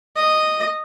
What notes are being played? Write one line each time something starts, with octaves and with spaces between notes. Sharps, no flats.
D#5